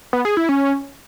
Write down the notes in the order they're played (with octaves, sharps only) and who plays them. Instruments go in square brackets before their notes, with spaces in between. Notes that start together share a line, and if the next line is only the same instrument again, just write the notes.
[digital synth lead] B3
G#4
E4
C#4